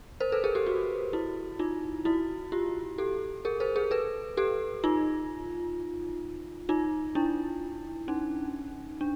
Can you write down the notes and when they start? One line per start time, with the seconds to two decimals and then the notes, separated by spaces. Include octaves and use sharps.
0.20 A#4 C5
0.32 A4 B4
0.44 G#4 A#4
0.55 G4 A4
0.66 F#4 G#4
1.13 E4 F#4
1.59 D#4 F4
2.05 E4 F#4
2.52 F4 G4
2.98 G4 A4
3.45 G#4 A#4
3.60 A#4 C5
3.76 G#4 A#4
3.91 A4 B4
4.37 G4 A4
4.84 D#4 F4
6.69 D#4 F4
7.15 D4 E4
8.08 C#4 D#4
9.01 D4